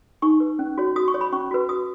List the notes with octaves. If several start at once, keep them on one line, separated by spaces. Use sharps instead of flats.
D#4 C#6
B4
C#4
F#4 C#5
F#4 D#6
C#6
C#5
B5
C#4 C#6
F#4 B4
F#4 D#6